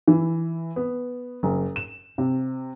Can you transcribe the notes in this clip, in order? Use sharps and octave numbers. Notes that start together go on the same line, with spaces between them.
E3
B3
F#1
E7
C3